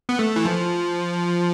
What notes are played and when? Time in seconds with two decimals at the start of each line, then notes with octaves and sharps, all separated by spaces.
0.09 B3
0.19 A3
0.36 E3
0.45 F3